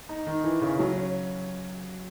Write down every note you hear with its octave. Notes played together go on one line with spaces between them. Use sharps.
D#4
D#3
E3
C#3
F#3
C#4